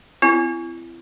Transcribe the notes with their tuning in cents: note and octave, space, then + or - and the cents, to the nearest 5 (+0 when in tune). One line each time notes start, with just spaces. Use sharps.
C4 -30 E4 +35